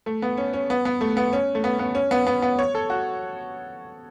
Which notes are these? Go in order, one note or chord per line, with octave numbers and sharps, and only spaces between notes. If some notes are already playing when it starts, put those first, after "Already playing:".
A3
B3
C#4
C#4
B3
B3
A3
B3
C#4
A3
B3
B3
C#4
B3
B3
B3
C#5
A4
F#4